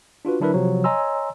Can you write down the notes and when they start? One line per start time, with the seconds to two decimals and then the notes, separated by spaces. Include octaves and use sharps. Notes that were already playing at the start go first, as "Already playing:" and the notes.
0.25 D4 F4 F#4 B4
0.40 D3 F#3 D4 E4 A#4 B4
0.54 C3 F3 F#3
0.84 C#5 D#5 G#5 A#5 C6 E6